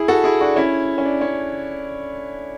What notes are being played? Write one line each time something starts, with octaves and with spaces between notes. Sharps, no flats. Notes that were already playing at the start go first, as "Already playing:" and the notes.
Already playing: E4 G#4
F#4 A4
E4 G#4
D4 F#4
C#4 E4
C#4
D4
C#4